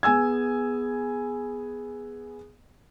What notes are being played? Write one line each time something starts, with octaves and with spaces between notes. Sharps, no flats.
B3 G#4 G#5 E6 G#6